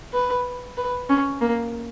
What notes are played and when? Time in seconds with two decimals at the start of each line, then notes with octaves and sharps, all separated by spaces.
0.13 B4
0.77 B4
1.09 C#4
1.41 A#3